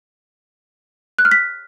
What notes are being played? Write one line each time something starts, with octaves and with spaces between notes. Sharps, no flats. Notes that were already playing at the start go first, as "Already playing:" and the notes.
F#6
F6
B6